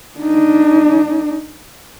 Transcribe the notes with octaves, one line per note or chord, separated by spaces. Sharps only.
D4 D#4